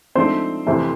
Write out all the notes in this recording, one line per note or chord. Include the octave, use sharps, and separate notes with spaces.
G#2 F3 A3 C4 D4 C5
F2 C3 E3 A3 C4